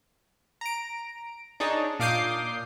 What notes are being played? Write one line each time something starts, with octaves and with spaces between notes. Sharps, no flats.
A#5 D7
D4 D#4 G#4 C#5 A5
A#2 F5 D6 D#6 G6 C7